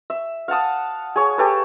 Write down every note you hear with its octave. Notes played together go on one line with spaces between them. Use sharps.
E5
F5 F#5 A5 D#6
G#4 C#5
G4 A4 B4